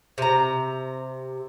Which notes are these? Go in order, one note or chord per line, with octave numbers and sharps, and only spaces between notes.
C3 A#5